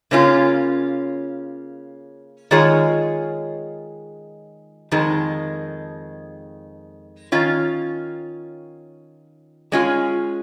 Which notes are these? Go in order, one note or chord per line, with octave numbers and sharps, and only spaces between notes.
C#3 A#3 C#4 F4
D#3 G#3 F4 G#4 C#5
F2 D#3 G#3
D#3 C#4 F4
G#3 C#4 F4